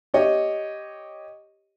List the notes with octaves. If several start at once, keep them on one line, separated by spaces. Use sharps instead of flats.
G4 C#5 D#5